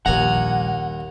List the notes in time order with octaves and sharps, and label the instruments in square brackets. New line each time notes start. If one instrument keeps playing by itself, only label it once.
[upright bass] A#1 G3 [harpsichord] D#2 G#5 A#5 [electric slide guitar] F#5